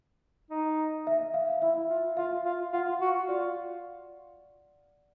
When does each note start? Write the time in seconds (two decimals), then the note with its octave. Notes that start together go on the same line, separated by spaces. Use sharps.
0.50 D#4
1.07 E5
1.34 F5
1.62 E4 E5
1.90 F4
2.17 F4 F5
2.45 F4
2.72 F4 F#5
3.01 F#4
3.29 F4 D5